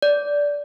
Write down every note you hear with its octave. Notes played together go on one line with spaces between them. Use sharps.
D5